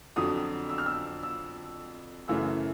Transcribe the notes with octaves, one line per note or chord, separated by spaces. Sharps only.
F2 D3 F#3 D#6
E6
F6
E6
E6
F#2 C#3 E3 A3 E6